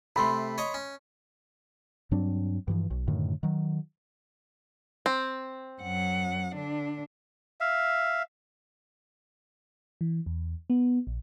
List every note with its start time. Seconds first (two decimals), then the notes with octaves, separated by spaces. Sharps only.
0.16 C3 A3 B5 C6
0.58 C#5 D#5 A#5
0.74 C#4
2.11 G2 F#3 C4 D4
2.68 G2 E3 F3
2.90 B1
3.08 F#2 A2 D3 D#3
3.43 D#3 F#3
5.06 C4
5.81 F#2 F#5
6.55 D3 D4
7.61 E5 F5
10.01 E3
10.26 E2
10.70 B3
11.07 A#1